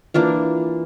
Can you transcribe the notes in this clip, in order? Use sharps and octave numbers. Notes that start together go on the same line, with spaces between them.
E3 A#3 D4 F4